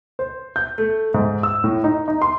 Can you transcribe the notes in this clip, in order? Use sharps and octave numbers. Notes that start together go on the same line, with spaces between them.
C5
G6
A3
G#2
E6
A2
D#4
D#4
C6